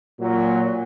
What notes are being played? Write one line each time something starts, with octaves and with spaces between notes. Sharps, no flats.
A#2 F#3